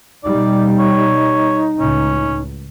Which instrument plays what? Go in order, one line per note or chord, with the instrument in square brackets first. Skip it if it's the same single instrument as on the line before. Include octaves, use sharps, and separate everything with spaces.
[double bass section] B2 G3 [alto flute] D#4 [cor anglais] D5
[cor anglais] C#5
[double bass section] C#2 A2 [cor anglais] C#4